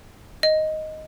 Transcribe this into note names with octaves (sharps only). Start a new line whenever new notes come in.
D#5